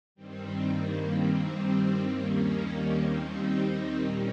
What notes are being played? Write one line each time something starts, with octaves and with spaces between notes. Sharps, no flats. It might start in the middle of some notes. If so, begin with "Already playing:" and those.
G2 D#3 G3 C4
A#3
C4
D#2 D#3 G3 A#3 C#4
C4 D#4
A#2 G3 A#3 C#4